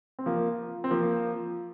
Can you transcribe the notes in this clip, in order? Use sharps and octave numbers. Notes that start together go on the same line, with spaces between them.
C4
F3 A#3
C4
F3 A#3